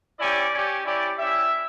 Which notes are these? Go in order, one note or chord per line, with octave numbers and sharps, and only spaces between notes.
C#4 E4 G4 D5
C#4 G4
C#4 E4 G4 D5
C#4 E4 G4 E5